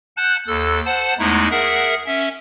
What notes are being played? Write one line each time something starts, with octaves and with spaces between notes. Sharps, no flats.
F#5 A5 F#6 G6
D#2 A4 E6
C5 F#5 A5
E2 G#3 A3 D#4 E4
G#4 A#4 E5 F#5
C#4 E5